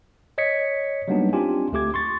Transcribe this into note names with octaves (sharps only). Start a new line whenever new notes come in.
C#5 D#5 G#6 B6 C#7
F#3 G3 A#3 B3 D4 D#4
C4 D4 F4 G4 G#5
D2 A3 G4 D6 G#6
C6 C#6 A6